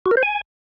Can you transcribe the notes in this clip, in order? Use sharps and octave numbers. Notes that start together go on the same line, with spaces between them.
F#4
A#4
C5
G#5